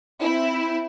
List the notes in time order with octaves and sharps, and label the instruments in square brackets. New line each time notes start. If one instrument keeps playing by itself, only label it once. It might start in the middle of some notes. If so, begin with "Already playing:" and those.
[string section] C4 E4